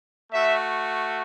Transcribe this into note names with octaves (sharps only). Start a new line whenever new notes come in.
A3 F#4 E5